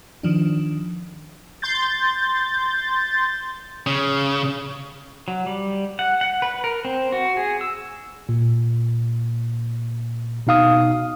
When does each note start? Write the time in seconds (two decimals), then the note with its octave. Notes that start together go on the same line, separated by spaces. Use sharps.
0.23 D#3 F3 D4
1.62 C6 G6 A6
3.87 C#3
5.28 F#3
5.46 G3
5.99 F#5
6.21 F#5
6.42 B4
6.64 A#4
6.85 C4
7.12 F#4
7.37 G#4
7.61 E6
8.29 A#2
10.47 B2 D#4 F5 D#6